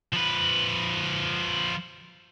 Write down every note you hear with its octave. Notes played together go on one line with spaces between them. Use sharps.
F3 B4